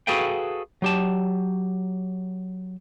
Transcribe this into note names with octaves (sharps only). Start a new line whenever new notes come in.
F#4 G#4 A4 B4 F5 G5
F#3 G4 A5